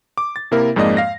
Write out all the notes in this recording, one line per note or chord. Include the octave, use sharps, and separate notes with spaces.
D6
A6
C3 A#3 E4 A#4
F2 G#2 G#3 A#3 D5 D#5
F5 A#6